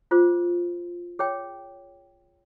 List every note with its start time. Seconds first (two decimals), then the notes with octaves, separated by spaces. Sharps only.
0.11 F4 G#4 C5
1.19 G#4 C#5 G5